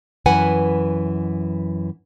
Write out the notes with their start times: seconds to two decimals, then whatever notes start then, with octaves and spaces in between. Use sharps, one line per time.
0.26 F#2 E3 B4 F#5 G#5